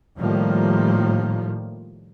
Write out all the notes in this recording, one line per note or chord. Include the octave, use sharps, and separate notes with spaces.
A2 D#3 F3 G3 A#3